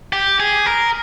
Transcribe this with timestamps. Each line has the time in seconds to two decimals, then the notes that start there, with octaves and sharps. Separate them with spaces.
0.13 G4
0.40 G#4
0.66 A#4